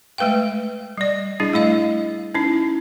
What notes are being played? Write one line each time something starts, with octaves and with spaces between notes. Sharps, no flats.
G#3 A3 B4 F5 G5
G3 D5
G3 D4 E4 G#4
A3 E4 D#5 F5
C#4 D#4 E4